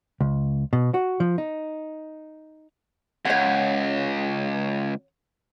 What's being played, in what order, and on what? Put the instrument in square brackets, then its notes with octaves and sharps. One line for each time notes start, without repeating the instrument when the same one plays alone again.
[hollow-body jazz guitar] C#2
B2
F#4
F3
D#4
[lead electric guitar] C#2 [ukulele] C#5 F#5